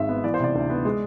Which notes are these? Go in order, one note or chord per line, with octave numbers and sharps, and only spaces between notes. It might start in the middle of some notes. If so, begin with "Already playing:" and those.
Already playing: G#1 G#2 G#3 E5
B3
E3 D5
C5
C3 D5
D2
B3
G#3